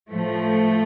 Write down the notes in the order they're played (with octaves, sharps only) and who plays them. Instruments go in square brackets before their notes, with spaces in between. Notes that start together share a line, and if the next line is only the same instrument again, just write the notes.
[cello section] A2 F3 A3